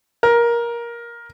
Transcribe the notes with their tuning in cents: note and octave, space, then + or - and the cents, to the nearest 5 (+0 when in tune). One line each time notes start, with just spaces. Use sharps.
A#4 +15